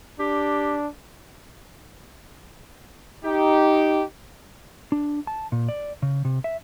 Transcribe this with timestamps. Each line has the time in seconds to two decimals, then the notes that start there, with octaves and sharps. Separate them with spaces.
0.20 D4 G4
3.24 D#4 G4
4.92 D4
5.27 A5
5.52 A#2
5.69 D5
6.02 C#3
6.25 C3
6.44 E5